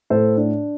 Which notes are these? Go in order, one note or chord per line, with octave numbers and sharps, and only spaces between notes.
A2 A4 C5
D4